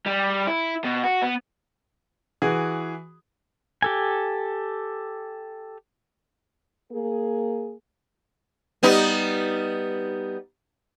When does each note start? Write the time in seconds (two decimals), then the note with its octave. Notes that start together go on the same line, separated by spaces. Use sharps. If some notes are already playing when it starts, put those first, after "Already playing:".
0.07 G3
0.47 E4
0.84 B2
1.04 F#4
1.22 B3
2.42 E3 F#4 G#4
3.82 G4 A4 G#5
6.92 A#3 G#4
8.83 G3 B3 D#4